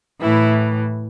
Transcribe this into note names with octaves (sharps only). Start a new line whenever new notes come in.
A2 E3 E4